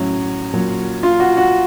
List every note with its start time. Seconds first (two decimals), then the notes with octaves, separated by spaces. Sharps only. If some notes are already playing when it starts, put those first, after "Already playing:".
Already playing: A2 F#3 C#4
0.53 A#2 F#3
1.03 F4
1.20 F#4
1.37 F#4